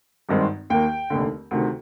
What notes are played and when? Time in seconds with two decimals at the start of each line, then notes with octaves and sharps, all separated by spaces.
0.29 G#1 G2 D#3 G#3 C4
0.70 D#2 D#3 A#3 G5
1.10 F1 D#2 D3
1.51 D2 C3 D#3